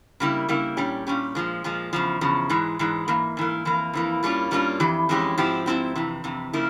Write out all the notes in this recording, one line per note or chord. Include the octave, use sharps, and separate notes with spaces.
C#3 G3 A#3 E4
C#3 G3 A#3 E4
A#2 G3 C#4 G4
A#2 G3 C#4 G4
A#2 F3 G#3
A#2 F3 G#3
E2 C#3 F3
E2 C#3 F3
G#2 E3 G#3
G#2 E3 G#3
G#2 E3 A#3
G#2 E3 A#3
F2 E3 A#3
F2 E3 A#3
G2 G3 A#3 C#4 F4
G2 G3 A#3 C#4 F4
F2 E3 G4
F2 E3 G#3 C#4 G4
G#2 F3 C4 E4 G4
G#2 F3 C4 E4 G4
F2 C3 E3
F2 C3 E3
C#3 F3 A#3 E4